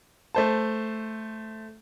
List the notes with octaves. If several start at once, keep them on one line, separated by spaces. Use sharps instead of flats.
A3 C5 A5